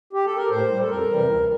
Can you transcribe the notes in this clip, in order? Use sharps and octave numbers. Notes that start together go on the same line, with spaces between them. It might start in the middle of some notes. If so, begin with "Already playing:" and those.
G4
A4
A#4
A2 C5
G3
A4
F2 A#4
C3 E3 G3
D2